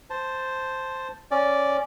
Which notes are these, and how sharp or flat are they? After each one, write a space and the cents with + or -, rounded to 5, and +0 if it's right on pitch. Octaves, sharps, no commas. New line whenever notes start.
C5 +0 A5 +0
C#4 +0 D5 -10